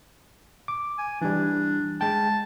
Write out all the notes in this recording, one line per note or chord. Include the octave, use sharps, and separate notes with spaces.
D6
G#5
E3 G3 D4
G#3 G5 A5